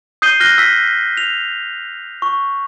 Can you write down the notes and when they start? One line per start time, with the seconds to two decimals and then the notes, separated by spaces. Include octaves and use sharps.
0.22 D#6 G6 C7 D#7 G7
0.40 F6 F#6 A#6 G7
0.58 E6 B6
1.17 F7
2.22 C#6